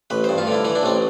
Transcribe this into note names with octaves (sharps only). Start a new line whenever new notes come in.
A1 B4
G2 C5
F4
D3
E4
E3 E4
D4
A1 C4